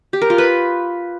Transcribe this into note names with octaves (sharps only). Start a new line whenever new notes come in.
G4
A#4
F4
B4